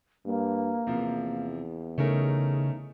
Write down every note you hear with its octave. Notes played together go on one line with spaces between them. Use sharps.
G2 A#3
E2 C3 F3
C#3 A3 C#4 D#4 A#4